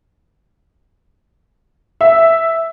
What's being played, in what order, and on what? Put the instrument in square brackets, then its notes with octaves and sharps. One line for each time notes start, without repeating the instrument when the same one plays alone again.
[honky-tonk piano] E5